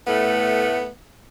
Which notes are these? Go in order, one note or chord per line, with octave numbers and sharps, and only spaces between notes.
A2 A3 B3